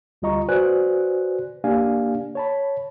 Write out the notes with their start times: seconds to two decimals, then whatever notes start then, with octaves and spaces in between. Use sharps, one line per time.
0.22 D2 G3 F4 D#5 A#5 C#6
0.49 F#4 B4 C5 D5 G#5 F#6
1.64 A#3 D4 G4 D5 F5 G#5
2.35 C#5 A5 B5